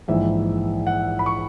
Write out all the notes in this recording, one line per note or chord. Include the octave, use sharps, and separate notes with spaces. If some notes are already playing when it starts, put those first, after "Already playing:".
A#1 G#2 E3 E5
F#5
B5
C#6